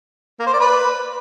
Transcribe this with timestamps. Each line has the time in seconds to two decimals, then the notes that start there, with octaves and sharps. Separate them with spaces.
0.40 A#3
0.47 C5
0.53 D5
0.60 B4